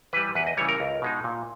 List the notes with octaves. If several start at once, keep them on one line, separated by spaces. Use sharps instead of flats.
E3 G3 B4
E2 B4
D#5
C#3 E3 G3 C#5
A#4
C#2
B2 G#3 D#4
A#2